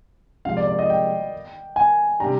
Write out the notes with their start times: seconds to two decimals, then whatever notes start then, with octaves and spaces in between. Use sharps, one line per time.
0.45 C3 F3 G#3 C4 F5
0.57 D5
0.67 D5
0.79 D#5
0.90 G5
1.76 G#5
2.20 C3 G3 D4 G4 A#5